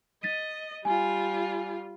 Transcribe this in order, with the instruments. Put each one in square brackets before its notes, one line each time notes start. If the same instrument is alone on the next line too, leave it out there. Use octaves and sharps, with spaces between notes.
[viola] D#5 [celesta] A6 B6 D#7
[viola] G3 F4 [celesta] G#5